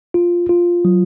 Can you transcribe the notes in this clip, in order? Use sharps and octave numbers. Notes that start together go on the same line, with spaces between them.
F4
F4
F#3